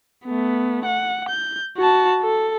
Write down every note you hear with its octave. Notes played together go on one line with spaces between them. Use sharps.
A3 B3
F#5
G6
F#4 A5
A4